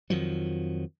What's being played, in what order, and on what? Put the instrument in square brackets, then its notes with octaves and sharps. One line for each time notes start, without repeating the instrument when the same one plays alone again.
[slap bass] F2 D#3 F3 F#3